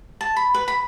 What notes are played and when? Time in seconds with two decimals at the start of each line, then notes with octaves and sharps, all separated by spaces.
0.21 A5
0.36 B5
0.54 B4
0.68 B5